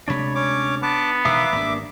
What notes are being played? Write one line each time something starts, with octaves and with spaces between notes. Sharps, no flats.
D2 C3 G#3 D4 C#5 B5
C#4 C#5 D6
B3 A5 D6
E1 B2 D#3 E5 F5 A#5 D6 D#6
G#1 G2 A#3 D4